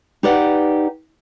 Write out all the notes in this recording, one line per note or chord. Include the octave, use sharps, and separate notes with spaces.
D#4 G4 B4 D5 F#5